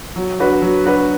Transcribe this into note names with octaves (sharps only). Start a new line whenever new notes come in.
F#3
D4 F#4 B4
F#3
D4 F#4 B4